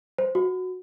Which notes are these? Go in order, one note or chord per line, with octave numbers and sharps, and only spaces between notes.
C5
F#4